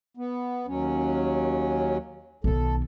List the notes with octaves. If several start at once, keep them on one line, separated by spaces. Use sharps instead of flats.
B3
D#2 F#3 C#4
B1 D#3 A4